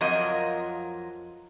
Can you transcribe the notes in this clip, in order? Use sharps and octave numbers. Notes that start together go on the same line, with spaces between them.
F2 F#3 F4 A#4 D#5